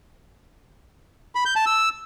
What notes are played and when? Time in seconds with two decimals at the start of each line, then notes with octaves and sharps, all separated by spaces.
1.35 B5
1.46 G6
1.56 A5
1.66 E6